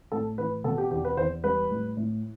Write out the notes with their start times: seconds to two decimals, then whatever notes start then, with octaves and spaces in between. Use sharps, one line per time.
0.12 A2 A4
0.38 E3 B4
0.64 B2 A4
0.78 G4
0.91 E2 G4
1.05 B4
1.17 E2 C5
1.44 G3 B4
1.70 A2
1.97 A2